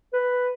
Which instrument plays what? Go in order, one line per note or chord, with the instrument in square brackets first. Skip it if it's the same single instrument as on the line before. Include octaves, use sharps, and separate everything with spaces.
[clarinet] B4